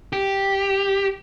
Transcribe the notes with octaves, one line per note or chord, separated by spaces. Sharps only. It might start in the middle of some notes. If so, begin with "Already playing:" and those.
G4